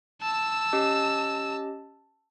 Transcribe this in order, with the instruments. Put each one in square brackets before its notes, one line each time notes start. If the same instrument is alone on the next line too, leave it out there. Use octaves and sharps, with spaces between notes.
[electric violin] A5 E6
[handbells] C#4 G4 D#5